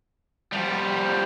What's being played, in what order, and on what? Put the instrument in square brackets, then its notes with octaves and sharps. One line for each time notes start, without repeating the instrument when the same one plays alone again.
[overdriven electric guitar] F3 G3